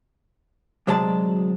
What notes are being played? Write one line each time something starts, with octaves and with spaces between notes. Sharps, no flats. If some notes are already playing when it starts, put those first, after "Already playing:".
D2 C3 F#3 G#3 D5 A5